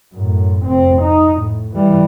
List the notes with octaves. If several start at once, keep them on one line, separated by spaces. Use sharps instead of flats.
F#2 A2
F1 C4
D#4
A2
E3 G3